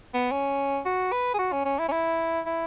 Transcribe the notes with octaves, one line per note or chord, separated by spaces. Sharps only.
B3
C#4
F#4
B4
G#4
F#4
C#4
C#4
E4
C#4
E4
E4